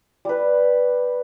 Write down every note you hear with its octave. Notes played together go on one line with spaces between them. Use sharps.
G3 B4